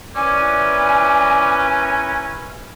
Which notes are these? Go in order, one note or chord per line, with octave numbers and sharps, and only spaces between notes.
C#4 E4 A#4 B4 D5 G#5